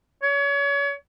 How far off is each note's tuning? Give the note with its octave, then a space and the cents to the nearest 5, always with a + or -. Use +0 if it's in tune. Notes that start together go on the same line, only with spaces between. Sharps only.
C#5 +35